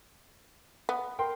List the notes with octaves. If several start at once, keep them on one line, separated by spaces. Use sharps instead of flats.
B3
A#4 G5 C6